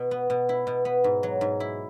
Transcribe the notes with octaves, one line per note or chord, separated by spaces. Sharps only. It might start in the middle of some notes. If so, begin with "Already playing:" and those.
Already playing: B2
B3
B2
E4
B2
B3
G#2
F#3
G#2
E4